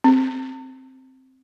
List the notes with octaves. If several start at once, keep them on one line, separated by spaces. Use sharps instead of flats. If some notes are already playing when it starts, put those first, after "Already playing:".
C4